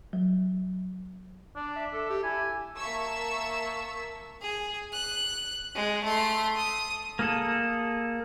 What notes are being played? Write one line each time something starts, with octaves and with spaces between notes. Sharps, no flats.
F#3
D4
E5
A4
G4
E4 G#5
A#3 E5 A5 C#6 E6
G#4
F#6
G#3
A3 C6
D#6
A#3 G#4 A4